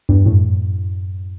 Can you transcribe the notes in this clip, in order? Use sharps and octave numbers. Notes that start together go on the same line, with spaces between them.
E2 G2
F#2 A2